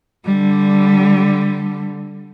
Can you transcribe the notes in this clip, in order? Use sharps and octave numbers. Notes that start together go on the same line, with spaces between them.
D3 G3